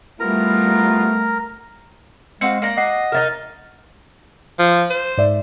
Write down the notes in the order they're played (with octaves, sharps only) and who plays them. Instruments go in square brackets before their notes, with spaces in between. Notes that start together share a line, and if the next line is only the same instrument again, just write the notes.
[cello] G3 [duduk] A3 [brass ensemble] B3 E4 F4 [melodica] A#4 A#5
[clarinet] G#3 [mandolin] C4 F#4 F5 [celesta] C#7
[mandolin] A#3 D5 A#5
[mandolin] F#4 [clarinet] D#5 [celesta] D6 C7
[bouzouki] D#4 E4 A#4 [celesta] F6 A6
[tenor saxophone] F3
C5
[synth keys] G#2 D5 E5